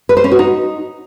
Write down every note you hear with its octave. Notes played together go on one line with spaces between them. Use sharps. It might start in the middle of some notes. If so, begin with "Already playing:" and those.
B4
C5
C#4
F#4
D#4